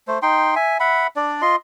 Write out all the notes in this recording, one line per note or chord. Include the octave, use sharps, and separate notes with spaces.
A3 C5
D#4 G5 C6
E5 G#5
E5 F#5 B5
D4 D5
F4 D#5 C6